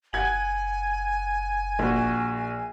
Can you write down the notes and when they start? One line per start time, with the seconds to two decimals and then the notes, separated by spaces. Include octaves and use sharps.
0.13 F#1 F#5 G#5 G#6 F#7
1.79 A#1 F#4